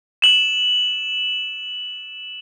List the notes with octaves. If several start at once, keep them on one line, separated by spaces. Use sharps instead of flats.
E7 F#7